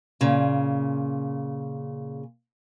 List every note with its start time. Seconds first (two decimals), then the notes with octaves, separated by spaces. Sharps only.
0.21 A#2 C#3